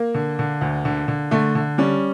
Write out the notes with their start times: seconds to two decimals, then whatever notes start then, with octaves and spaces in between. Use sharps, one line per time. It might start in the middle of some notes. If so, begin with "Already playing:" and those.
Already playing: A#3
0.14 D3
0.39 D3
0.61 D2
0.85 D3
1.08 D3
1.31 D3 A3
1.55 D3
1.78 G3 C#4